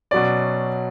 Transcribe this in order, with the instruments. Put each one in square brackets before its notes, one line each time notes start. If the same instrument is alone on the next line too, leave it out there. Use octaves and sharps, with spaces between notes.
[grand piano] B2 F#3 C#4 D5